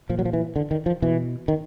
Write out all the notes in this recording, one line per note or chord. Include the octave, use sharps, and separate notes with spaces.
A#2 F3
F#3
F3
E3
D3
D#3
F3
B2 E3
D#3